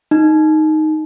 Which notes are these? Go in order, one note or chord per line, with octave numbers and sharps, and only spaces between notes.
D#4